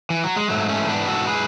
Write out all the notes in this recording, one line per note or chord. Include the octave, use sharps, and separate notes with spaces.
E3
F#3
G#3
G#2 F#3 A3
A3 C#4
E3
B3 D4
G#2 F#4 A4
G#4 B4